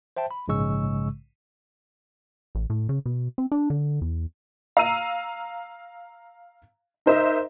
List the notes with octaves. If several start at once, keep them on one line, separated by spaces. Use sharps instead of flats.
C5 E5 G5 A5
B5
A#1 G#2 C#3 G#3 C#6 E6
A1
A2
C#3
B2
C4
D4
D3
E2
F5 A#5 E6 D#7
D#4 A#4 C5 D#5 E5